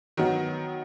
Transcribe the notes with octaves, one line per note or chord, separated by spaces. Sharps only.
D#3 F#3 B3